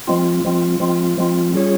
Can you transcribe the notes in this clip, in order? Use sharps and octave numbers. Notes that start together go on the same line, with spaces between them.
F3 G#3 C4 F4
F3 G#3 C4 F4
F3 G#3 C4 F4
F3 G#3 C4 F4
G3 C#4 F4 G#4 C#5